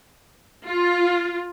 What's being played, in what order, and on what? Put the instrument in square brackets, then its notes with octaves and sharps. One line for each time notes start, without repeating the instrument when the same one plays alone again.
[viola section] F4